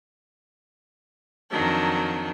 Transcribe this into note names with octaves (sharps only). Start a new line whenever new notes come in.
F2 D#3 F#3 D4